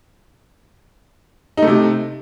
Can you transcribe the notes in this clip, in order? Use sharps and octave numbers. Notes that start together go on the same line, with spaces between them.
C3 A3 D#4